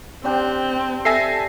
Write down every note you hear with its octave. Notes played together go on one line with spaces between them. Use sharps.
C4 D4 G4 C5
A4 E5 G#5 E6 A#6 C7